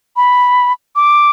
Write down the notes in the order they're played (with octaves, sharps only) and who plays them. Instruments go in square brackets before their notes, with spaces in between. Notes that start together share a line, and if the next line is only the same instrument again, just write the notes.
[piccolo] B5
D6